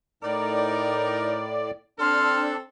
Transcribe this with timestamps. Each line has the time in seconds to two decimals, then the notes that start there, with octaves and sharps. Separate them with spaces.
0.23 A2 D#4 A#4 D5
1.99 C4 D4 A4 C6 F6